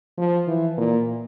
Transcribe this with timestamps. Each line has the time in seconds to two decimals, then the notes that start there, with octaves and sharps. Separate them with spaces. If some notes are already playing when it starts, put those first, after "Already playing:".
0.18 F3
0.47 E3
0.78 A#2